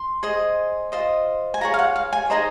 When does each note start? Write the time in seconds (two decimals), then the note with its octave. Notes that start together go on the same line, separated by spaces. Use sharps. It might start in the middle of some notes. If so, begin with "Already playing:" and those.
Already playing: C6
0.23 G#4 C5 D#5
0.92 F4 C5 D#5
1.54 G#5
1.61 F4 G#4 C#5 A#5
1.74 F5
1.79 F#5
1.96 F5
2.13 G#5
2.30 D#4 G#4 C5 D#5 A#5